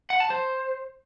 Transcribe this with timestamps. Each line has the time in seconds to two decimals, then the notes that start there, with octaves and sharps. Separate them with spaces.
0.10 F#5
0.20 A5
0.30 C5